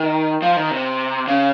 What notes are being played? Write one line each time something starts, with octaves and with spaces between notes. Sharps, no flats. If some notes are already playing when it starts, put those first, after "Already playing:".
Already playing: D#3
F3
D#3
C3
C#3